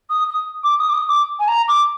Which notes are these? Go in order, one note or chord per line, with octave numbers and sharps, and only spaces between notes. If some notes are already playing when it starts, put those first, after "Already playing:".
D#6
D#6
D6
D#6
D6
D#6
D6
G#5
A#5
D6